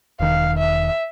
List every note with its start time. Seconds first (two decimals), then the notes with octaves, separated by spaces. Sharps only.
0.20 E1 D#3 F5
0.58 E5